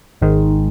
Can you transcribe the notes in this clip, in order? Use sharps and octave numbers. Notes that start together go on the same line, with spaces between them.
G#1 G#2 D#3 G#3